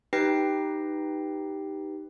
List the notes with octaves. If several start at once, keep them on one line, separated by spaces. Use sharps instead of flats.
D#4 G4 B4 G5 A#6 C7